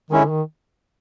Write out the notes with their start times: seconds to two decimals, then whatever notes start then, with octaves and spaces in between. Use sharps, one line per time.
0.11 D#3 G#3 C#4 E4
0.21 D3
0.30 D#3